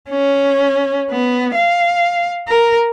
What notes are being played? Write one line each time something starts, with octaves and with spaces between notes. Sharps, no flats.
C#4
B3
F5
A#4